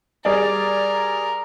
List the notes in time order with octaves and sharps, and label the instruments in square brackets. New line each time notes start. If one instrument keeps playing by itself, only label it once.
[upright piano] G3 G#4 D5 [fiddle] A#4